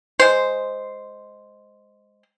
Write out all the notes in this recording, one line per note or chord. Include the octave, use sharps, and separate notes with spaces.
G#3 C5